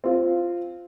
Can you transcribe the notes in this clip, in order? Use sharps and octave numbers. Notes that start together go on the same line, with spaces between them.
C4 F4